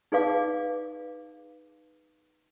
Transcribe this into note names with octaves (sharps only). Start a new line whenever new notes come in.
D#4 G#4 B4 D5 F5 D6